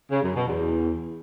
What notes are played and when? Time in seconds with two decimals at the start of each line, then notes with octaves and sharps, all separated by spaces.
0.10 C#3
0.22 F#2
0.34 B2
0.46 E2